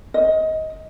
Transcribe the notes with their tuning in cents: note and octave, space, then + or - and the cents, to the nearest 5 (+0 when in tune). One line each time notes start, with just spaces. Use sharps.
D#5 +20